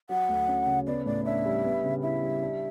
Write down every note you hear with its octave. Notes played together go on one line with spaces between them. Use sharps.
F#3 F#5
D2
C#4
C#3
B3 D5
A2 D5
D4 E5
G3
B3
C#3
E4 E5
G3
D4